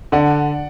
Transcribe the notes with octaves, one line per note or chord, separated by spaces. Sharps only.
D3 D5 F#5